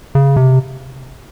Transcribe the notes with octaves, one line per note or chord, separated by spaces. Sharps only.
C#3
C3